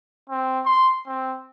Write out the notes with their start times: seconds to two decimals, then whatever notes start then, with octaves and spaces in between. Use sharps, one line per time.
0.30 C4
0.65 C6
1.07 C4